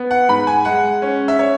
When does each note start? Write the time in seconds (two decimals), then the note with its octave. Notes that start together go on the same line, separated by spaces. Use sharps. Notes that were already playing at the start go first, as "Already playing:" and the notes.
Already playing: B3
0.11 F#5
0.29 G#2 B5
0.47 G#5
0.65 G#3 F#5
1.02 C#4
1.28 E5
1.39 C#5